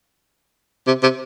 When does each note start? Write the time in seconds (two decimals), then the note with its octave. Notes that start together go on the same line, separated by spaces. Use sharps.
0.87 C3
1.03 C3